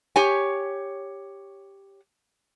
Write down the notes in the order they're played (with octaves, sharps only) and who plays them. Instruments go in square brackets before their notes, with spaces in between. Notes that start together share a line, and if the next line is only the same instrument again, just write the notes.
[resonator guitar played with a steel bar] G4 C#5 G#5